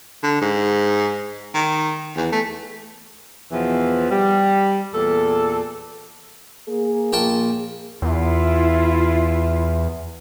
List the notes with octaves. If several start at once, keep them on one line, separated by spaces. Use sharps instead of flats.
D3
G#2
D#3
E2
A3
E2 B2 E3 F3
G3
E2 A#2 A4
A#3 G#4
A#1 G5 A5
E2 E4 F4